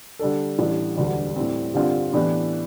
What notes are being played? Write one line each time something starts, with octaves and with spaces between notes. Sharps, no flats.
D3 G3 D4 A4
A1 A2 G3 D4
E1 D2 D3 G3
A2 G3 C4
G2 D3 G3 C4 F4
A2 E3 B3 D4 G4